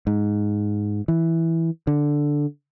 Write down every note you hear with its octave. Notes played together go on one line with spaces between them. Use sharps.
G#2
E3
D3